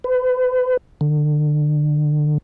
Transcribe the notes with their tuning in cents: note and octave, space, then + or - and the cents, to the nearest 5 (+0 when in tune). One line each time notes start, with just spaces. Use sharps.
B4 +40
D3 +30